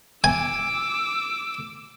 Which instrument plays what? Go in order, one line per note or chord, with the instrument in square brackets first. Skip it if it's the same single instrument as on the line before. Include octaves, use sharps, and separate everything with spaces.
[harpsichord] G#5 [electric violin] D6 E6